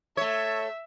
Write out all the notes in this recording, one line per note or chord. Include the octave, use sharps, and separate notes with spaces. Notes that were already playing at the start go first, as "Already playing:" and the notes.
A3 C#5 E5